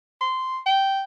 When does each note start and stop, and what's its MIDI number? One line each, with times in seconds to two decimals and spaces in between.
0.21 0.58 84
0.66 1.02 79